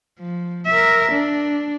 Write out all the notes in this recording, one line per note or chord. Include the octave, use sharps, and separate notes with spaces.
F3
A#4 E5
D4